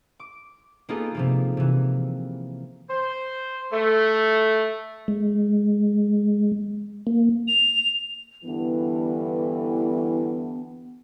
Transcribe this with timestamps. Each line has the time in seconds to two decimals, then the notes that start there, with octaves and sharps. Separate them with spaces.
0.20 D6
0.89 A#3 B3 D#4 F4 G#4 A4
1.15 C3 F3 A#3
1.57 C3 E3
2.89 C5
3.72 A3
5.08 G#3
7.07 A#3
7.48 F7
8.44 G2 D3 E3 B3